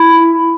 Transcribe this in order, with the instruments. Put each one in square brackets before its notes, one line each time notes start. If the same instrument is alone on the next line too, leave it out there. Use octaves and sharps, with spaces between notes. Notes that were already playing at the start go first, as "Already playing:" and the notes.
Already playing: [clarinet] E4